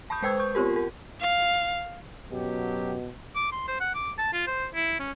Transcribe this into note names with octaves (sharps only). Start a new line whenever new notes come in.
A5 B5 C#6 D#6 G6
G#3 B4 C5 G5 E6 G#6
C#6 G6
B3 C4 F4 G4 A#4
G4 A#4
F5
F#2 B2 F#3 G4
D6
C6
C5
F#5
D6
A5
F4
C5
E4
C#4